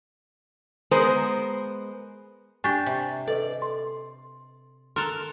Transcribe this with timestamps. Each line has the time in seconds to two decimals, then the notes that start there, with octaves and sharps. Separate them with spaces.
0.91 G#3 B3 A#4 C5
2.64 D4 G4 G#5 C#6 A6
2.86 C3
3.28 A4 B4 D5 D#5
3.62 C6
4.96 A4 A#4 C6 F#6 F7